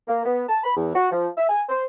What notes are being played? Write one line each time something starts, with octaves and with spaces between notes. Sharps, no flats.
A#3
B3
A5
B5
E2
F#4
F3
E5
G#5
C5